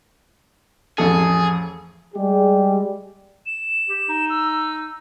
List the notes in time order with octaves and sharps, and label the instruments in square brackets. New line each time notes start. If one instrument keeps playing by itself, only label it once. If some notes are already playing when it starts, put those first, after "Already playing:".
[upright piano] A1 F2 A4 [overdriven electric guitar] G#4
[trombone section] G3 G#3 G4 G#4
[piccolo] E7
[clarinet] G4
D#4
[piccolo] E6